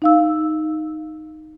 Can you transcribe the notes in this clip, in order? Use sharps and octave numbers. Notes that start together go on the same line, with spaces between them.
D#4 F5 E6